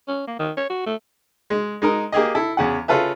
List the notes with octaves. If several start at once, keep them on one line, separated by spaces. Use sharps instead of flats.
C#4
A#3
D#3
C#5
F#4
A3
G#3
G#3 D#4 A#4
A#3 G4 G#4 D#5
E4 A4
E2 C#3 F#5
C#3 C#4 F4 A4 B4 E5